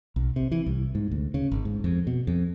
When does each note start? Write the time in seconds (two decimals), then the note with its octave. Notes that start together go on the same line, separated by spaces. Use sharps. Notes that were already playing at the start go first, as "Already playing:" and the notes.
0.16 B1
0.36 C3
0.52 E3
0.66 C2
0.95 G#2
1.11 D2
1.34 C#3
1.52 G#1
1.65 G#2
1.84 F2
2.07 B2
2.27 F2